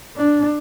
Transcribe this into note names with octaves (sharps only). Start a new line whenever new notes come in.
D4